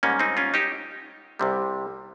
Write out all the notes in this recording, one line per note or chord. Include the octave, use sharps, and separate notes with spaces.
G#2 G3 A#3 C#4
C4 D#4
C#4 F4
D#4 G4
C2 C3 G3